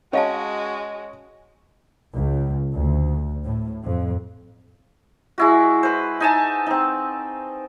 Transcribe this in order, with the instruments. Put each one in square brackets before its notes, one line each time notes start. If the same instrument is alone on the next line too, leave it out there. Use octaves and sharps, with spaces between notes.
[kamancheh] G#3 F#4 [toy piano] C#4 F5 A5 [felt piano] C#5 D#5
[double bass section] C#2
D2
A2
F2
[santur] G#3 E4 F#4
B4 C5
D#4 G#5 A5
C4 D#4